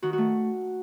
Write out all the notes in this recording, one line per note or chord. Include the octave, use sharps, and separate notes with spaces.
D#3 F#4
F#4
A3